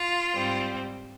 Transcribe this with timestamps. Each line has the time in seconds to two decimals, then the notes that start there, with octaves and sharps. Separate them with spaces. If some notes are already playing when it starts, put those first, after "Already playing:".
Already playing: F4
0.33 G#2 G3 C4